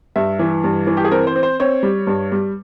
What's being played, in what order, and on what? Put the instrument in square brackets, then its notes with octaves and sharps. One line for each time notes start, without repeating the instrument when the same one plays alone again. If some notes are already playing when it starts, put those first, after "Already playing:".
[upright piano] G2 E5
E3
G2
E3
G4
G#4
C4 A#4
C5
C4
C5
C4 C#5
G3
G2
G3